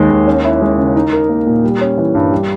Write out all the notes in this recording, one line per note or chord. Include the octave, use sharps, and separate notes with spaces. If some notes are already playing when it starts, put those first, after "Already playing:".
Already playing: D#2 D#3 G#3
D#2
C#4
E4
G#3
C#3
D#4
A#4
A#3
A#2
G3
C#4
E3
G2
G3